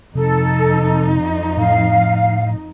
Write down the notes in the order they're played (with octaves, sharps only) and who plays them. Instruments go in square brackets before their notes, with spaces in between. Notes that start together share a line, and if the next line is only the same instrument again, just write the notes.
[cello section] F2 D#4 [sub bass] C3 [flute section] A4
[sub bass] A2 [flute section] F5